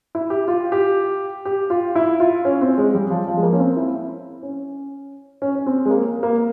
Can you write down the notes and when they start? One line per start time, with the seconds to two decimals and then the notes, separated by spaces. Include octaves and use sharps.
0.15 E4
0.30 G4
0.48 F4
0.72 G4
1.45 G4
1.70 F4
1.95 E4
2.20 F4
2.45 C#4
2.61 C4
2.78 G#3
2.95 G3
3.10 F3
3.28 F3
3.37 G#3
3.43 A#3
3.53 C#4
3.59 C4
3.77 E4
4.43 C#4
5.42 C#4
5.55 C#4
5.66 C4
5.85 G#3
5.90 A#3
6.23 A#3